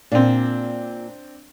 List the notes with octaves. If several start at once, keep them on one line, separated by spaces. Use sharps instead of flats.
A#2 C4 D4